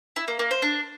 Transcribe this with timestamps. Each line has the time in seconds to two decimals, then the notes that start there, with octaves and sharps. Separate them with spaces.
0.16 E4
0.28 A#3
0.39 A#3
0.51 C5
0.62 D4